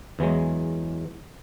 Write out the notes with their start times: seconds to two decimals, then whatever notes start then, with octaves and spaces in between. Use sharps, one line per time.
0.19 E2 E3 F#3 G#3